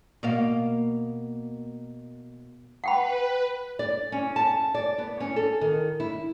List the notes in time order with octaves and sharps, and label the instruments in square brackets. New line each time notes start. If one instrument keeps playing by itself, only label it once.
[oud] B2 A#3 F5
[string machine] B4 [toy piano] F#5 G5 B5
[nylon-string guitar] D5
C#4
A5
D5
B3
C#4
A4
D#3
E4